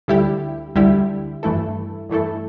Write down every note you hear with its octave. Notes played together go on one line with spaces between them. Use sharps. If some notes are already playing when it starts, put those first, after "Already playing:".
D2 D3 G3 E4 G4
D2 D3 G3 E4 G4
G2 E3 A3 E4 A4
G2 E3 A3 E4 A4